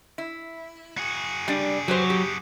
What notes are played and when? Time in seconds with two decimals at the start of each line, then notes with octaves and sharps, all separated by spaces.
0.18 E4
0.97 F#4 G#4
1.48 G3 D4
1.88 F#3 G4 B4 C5
2.10 G4